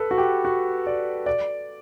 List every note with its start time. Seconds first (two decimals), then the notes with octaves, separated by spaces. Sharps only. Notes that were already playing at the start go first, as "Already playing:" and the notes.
Already playing: A4 B4
0.11 F#4
0.18 G4
0.45 F#4
0.87 D5
1.26 D5